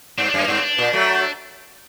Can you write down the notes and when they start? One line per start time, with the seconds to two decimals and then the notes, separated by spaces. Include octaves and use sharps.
0.18 G2 C4
0.29 D4
0.34 F#2 A#3
0.48 G2 C4
0.63 D4
0.78 A#2
0.93 F#3 A3